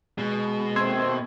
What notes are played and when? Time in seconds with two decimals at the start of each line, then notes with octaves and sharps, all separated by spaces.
0.18 B2 G#3
0.76 D#2 A3 C4 C6 E6 G#6